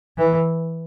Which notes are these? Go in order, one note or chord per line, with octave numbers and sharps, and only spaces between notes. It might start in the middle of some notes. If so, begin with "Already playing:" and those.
E3